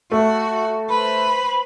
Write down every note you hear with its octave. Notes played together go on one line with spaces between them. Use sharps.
A3 F#4
B4 C5 B5